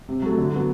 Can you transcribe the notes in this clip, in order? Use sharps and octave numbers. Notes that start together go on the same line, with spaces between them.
C3
F#3 A3
D3
F#3 B3